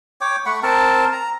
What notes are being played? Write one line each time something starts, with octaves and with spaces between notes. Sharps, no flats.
C#5 G5 D6
A3 F#5 B5 C#6
C4 A#4 A5
A#5